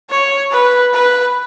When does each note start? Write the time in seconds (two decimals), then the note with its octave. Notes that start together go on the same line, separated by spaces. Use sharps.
0.10 C#5
0.52 B4
0.94 B4